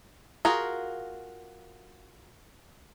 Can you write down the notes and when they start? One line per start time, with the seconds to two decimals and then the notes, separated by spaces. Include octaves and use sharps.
0.45 F4 F#4 G#4 A#4